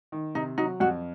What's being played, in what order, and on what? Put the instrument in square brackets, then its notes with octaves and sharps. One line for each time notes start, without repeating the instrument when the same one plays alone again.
[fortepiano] D#3
[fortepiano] C3 [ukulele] D#4
[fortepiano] F#3 [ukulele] D#4
[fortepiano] F2 [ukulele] F#4